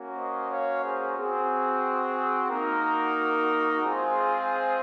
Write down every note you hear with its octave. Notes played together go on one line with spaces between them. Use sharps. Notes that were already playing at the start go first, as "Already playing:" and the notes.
Already playing: A#3 C#4 F#4
C5 D#5
C#5 F5
G#4 C5
C4 F#4 G#4
A#3 D#4 F#4 A#4
G#3 C4 F4 G#4 C5